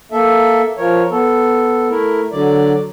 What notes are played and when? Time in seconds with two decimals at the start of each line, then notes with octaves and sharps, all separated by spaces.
0.12 A#3 A4 E5
0.77 F3 A#4 C#5
1.11 B3 A4
1.89 A3 E4 A#4
2.32 D3 F#3 D5